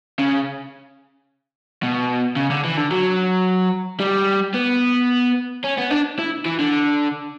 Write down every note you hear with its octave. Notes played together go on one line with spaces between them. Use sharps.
C#3
B2
C#3
D3
E3
D3
F#3
G3
B3
C#4
B3
D4
E4
E3
D3